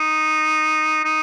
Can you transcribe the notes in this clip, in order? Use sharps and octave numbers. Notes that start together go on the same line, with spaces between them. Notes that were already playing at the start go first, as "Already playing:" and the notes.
Already playing: D#4
D#4